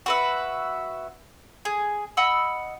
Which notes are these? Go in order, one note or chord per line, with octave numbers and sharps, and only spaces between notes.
F#4 B4 E5
G#4
D#5 F#5 B5 E6